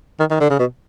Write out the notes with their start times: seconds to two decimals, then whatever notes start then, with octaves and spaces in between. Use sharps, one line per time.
0.20 D#3
0.30 D#3
0.40 D3
0.50 C#3
0.59 B2